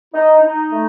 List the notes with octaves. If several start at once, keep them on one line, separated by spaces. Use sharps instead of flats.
D#4
D#4
A3